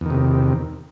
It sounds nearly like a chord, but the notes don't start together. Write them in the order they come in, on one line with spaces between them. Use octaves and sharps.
E2 D#3 C3